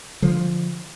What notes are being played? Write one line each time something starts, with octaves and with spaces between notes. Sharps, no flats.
D3 F3